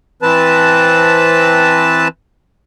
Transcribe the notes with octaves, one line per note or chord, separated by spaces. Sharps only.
E3 C4 B4 A5